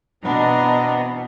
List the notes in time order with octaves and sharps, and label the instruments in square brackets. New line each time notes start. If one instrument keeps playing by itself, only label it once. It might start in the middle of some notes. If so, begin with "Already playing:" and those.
[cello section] B2 E3 C4 [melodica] B3 [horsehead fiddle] D4 [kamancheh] D#5 A#5